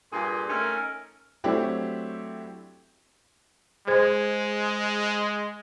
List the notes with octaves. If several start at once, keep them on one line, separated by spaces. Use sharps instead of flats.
G2 A#2 G#4 C6
A3 C#4 D#4 A#4
F#3 A3 C4 D4 E4 G4
G#3 G#4 C5 G#6